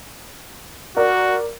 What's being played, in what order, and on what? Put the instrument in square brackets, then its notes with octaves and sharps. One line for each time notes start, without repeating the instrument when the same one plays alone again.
[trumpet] F#4 [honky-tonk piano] A#4 D5